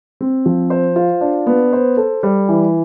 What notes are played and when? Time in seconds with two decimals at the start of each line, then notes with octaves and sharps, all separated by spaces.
0.21 C4
0.46 F3
0.70 C5
0.96 F4
1.21 D4
1.47 B3
1.73 C5
1.97 A4
2.23 G3
2.49 E3